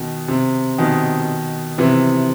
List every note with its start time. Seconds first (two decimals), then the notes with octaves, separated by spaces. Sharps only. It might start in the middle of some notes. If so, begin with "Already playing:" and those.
Already playing: B2 D#3
0.28 C3
0.78 B2 D#3
1.78 C3 E3